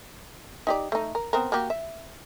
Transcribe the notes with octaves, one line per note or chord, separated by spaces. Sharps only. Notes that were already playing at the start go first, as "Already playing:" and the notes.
D#4 G4 D5
A3 D#4
A#4
B3 C4 A#4
A#3 F#4 G4
E5